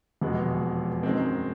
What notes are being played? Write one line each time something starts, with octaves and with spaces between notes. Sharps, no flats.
F1 E2 B2 G#3 B3
F#2 D#3 G#3 C4